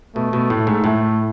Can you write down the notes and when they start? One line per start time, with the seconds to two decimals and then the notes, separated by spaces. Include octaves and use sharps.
0.16 B2 A3
0.33 B2
0.50 A2
0.67 G#2
0.84 A2 A3